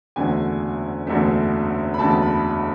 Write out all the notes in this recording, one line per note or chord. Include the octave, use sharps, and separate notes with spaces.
F#1 E2 D3 F#3 A3 G#5
F#1 E2 D3 F#3 A3
B5
F#1 E2 D3 F#3 A3 A5
A5
B5
B5